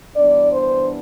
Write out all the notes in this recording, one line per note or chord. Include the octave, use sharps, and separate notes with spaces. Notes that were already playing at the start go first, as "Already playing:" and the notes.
G2 E3 B3 D4 D5
C5